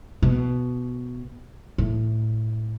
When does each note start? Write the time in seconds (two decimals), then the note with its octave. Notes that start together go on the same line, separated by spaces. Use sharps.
0.22 B2
1.78 A2